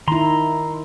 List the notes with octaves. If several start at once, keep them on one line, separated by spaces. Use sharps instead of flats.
D#3 E4 A#5 C6